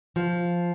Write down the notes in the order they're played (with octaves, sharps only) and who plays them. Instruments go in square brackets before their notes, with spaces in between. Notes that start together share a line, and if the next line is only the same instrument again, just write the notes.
[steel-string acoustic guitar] F3